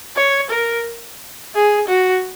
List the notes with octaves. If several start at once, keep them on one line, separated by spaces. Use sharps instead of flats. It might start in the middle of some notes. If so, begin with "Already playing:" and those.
C#5
A#4
G#4
F#4